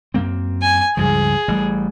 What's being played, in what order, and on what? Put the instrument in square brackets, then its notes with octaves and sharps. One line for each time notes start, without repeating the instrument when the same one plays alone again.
[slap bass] F#2 A#3 C4
[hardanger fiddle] G#5
[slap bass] C#2 G2 F3 [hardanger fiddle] G#4
[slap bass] A1 G3